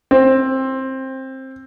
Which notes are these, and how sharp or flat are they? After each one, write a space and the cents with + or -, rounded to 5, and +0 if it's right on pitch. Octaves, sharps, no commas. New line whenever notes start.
C4 +15